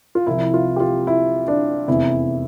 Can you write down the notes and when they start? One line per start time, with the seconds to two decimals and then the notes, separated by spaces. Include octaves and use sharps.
0.15 F4
0.26 C2 C3 F3 E4
0.54 F4
0.76 G4
0.80 F4
1.07 E4
1.48 D4
1.88 F1 E2 C3 E4